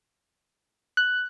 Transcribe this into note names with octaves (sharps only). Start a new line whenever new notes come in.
F#6